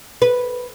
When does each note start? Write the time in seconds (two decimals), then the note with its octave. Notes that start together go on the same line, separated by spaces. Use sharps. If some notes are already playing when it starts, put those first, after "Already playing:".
0.22 B4